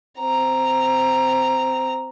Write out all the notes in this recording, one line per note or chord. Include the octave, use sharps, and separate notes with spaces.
C4 A#5